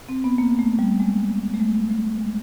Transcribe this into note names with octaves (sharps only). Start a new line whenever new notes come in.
C4
B3
A#3
A3
G3
G#3
A3
G#3
A3
G#3